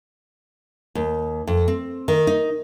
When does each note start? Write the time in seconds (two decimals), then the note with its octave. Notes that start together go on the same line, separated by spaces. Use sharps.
0.95 D#2
1.47 F2
1.68 C4
2.08 D#3
2.27 D#4